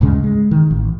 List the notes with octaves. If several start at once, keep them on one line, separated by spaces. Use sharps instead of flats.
D2 G#2 C#3 G#3
G#3
D#3
A1